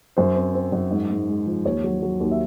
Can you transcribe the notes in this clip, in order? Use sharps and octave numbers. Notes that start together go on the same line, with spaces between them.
F#2 C5
C4
C4
F#2
G#2
G#2
G#3
F3
D#2 C#5
F#3
F#3
D#2
E5